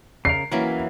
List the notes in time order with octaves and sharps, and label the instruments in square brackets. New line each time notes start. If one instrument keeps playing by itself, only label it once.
[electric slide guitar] C#3 A#4 [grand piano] C7
[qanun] E3 F#3 A#3 [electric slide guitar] C#4 E4 A#4